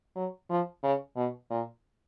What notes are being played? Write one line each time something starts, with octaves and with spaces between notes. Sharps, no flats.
F#3
F3
C#3
B2
A#2